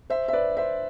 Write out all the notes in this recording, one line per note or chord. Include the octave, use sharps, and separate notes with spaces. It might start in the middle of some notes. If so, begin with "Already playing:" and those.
C5 E5
E5
B4 D5
C5 E5